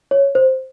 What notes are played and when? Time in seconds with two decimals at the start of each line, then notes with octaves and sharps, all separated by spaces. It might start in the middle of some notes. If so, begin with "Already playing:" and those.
0.11 C#5
0.35 C5